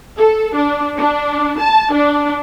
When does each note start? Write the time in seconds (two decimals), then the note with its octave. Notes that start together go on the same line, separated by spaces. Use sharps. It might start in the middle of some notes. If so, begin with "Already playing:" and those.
0.17 A4
0.55 D4
0.98 D4
1.59 A5
1.93 D4